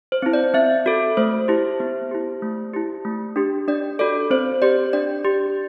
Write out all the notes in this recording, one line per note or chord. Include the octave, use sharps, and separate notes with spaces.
C5
C4 E4
D5
C4 E5
F#4 A4
A3 C5
E4 G4
B3
E4 G4
A3
E4 G4
A3
D4 G4
D4 D5
F#4 A4 D5
C4 C5
G4 D5
D4 D5
G4